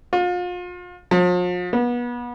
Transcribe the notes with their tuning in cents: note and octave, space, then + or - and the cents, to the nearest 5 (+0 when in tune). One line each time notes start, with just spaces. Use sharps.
F4 +35
F3 +40
B3 -30